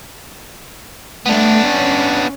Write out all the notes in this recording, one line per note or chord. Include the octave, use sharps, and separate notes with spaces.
A3 B3 D4
C#4